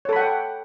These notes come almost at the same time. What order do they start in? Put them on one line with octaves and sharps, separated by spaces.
C#5 A4 B5 F#5 G5